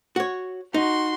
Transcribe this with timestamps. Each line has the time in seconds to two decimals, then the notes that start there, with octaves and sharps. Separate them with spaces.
0.16 F#4 C#5
0.74 D#4 F#4 C6